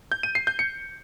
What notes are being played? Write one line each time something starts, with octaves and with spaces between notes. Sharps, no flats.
G6
D#7
C7
G6
C#7